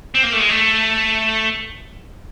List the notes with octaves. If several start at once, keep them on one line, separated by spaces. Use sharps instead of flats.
C4
A#3
A3
G#3
A3